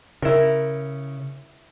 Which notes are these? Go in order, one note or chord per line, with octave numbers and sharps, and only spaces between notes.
C#3 E4 A#4